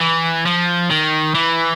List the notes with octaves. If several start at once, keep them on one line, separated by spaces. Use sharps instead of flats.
E3
F3
D#3
E3